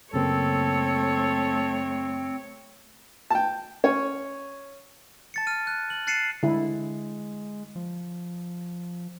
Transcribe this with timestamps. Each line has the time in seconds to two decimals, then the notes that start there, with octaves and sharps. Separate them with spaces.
0.13 F#2 C#3 A3 A#3 C4 A4 C#5
3.30 G5 A5
3.84 C#4 C#5
5.34 A5 A6 C#7
5.47 A5 F6 D#7
5.67 F#6
5.90 F#7
6.07 F#6 A6 C7 C#7 D#7 E7
6.43 D3 G#3 E4
7.76 F3